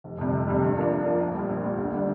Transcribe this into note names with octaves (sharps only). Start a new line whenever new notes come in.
F1
F2 C3 G3
F1
F2 C3 G3
G2
F3 A#3 D4
G2
F3 A#3 D4
A#1
A#2 G3
A#1
A#2 G3
D2
D3 G3 D4